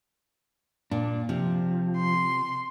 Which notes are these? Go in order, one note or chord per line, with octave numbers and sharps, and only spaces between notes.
A#2 D4
C3 F3
C6